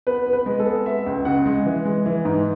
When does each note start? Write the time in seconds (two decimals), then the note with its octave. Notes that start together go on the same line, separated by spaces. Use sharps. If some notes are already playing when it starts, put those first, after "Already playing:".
0.07 B3 B4
0.26 B3
0.33 B4
0.46 G#3
0.60 A4
0.66 B3
0.86 B3 E5
1.06 C#2
1.25 C#3 F#5
1.46 G#3
1.66 E3
1.85 G#3
2.06 E3
2.25 G#2